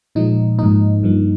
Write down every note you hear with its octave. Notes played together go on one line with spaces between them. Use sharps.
A#2 F3 G#3 D#4
G#2 F3 A#3 D#4
G2 F3 A#3